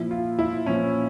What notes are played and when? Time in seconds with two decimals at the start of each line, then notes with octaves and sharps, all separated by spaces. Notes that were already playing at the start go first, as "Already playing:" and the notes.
Already playing: A#2 F3 E4
0.11 F4
0.39 E4
0.66 A#2 F3 C#4